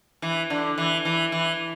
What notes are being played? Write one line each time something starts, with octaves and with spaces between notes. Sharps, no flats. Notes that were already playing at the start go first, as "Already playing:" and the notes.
E3
D3
E3
E3
E3